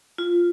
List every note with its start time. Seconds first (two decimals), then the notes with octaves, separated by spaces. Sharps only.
0.18 F4